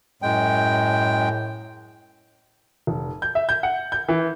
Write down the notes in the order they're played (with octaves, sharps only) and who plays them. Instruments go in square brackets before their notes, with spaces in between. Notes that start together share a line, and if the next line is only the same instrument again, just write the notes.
[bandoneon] F#2 G#3 G5 [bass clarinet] A2
[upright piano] F1
G6
E5
G6
F#5
G6
E3